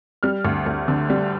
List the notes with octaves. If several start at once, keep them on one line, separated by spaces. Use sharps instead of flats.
G3 F6
D2
D2
D3
G3